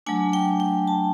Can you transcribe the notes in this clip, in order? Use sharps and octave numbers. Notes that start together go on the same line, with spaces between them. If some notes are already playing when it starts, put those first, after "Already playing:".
F#3 A3 D4 G#5
G5
G5
A5